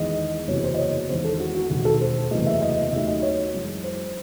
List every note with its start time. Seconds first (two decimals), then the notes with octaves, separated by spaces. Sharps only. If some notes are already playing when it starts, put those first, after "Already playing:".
Already playing: E2 D#3 G#3 D#5
0.48 F#1 E2 C3 F#3 C#5
0.64 C5
0.74 D#5
0.78 C#5
1.09 E2 D#3 G#3 C5
1.24 A4
1.40 F#4
1.55 F#4
1.70 E1 D#2 D#3 F#4
1.85 A4
2.01 C5
2.31 F#1 E2 C3 F#3 A3 D#5
2.47 E5
2.61 D#5
2.92 D#2 D#3 F#3 A3 E5
3.07 D#5
3.22 C#5
3.54 F#2 E3 G#3
3.84 C5